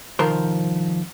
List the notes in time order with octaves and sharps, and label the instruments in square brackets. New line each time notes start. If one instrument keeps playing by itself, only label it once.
[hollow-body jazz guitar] C2 F2 D#3 F3 A#4 C5